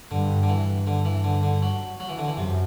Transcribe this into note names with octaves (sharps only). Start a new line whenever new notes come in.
G2 D3
D3
E3
D3
E3
D3
D3
F#3
F#3
E3
D3
E3
F#2 C3